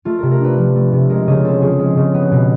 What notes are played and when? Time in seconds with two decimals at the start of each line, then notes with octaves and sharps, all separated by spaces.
0.05 A3 F4
0.19 C3 A#4
0.31 A#4
0.40 D4 B4
0.58 F3
0.75 A3
0.93 C3
1.09 G#3 A#4
1.27 C#3 G#4
1.44 C4 A4
1.62 F3 G#4
1.79 G#3
1.97 C#3
2.14 B3
2.31 B2